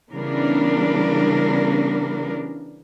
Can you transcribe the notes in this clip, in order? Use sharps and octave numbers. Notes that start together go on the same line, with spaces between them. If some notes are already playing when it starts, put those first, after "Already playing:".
C#3 E3 G3 B3 D4 A#4